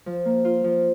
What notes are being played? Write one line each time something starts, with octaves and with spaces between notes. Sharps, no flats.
F3
A#3
F4
F3